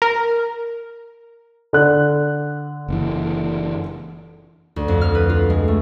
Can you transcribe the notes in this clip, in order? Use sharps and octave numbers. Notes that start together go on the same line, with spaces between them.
A#4
D3 F#6
F#1 E3
D2
F2
F6
B4
F4
G#3
A3